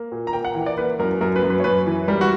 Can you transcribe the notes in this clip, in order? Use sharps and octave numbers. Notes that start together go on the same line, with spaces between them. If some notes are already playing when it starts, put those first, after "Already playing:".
Already playing: A#3
A#2
A#5
A#3 G5
F#5
E3 F#5
D5
A#3 B4
F#2 A#4
F#2 A#4
B4
F#2
B4
C#5
F#2 B4
E3
G3 A#4
F#4